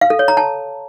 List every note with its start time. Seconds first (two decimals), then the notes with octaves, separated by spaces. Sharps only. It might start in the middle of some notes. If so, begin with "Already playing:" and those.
0.01 F5
0.10 A4
0.19 C#5
0.28 A#5
0.37 A5